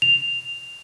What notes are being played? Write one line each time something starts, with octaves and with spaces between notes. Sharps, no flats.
F7